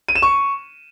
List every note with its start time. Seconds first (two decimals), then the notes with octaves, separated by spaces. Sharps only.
0.08 D#7
0.15 E7
0.22 C#6